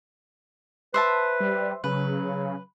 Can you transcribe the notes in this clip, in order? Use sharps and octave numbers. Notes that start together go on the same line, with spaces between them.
B4 C5 E5 A5
G3
C#3 F#3 B4